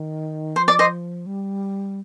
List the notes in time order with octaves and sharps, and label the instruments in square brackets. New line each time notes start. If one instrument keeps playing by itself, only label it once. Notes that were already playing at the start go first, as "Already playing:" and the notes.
Already playing: [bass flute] D#3
[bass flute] F3 [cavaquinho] C5
[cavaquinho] D5
C5 D#5
[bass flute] G3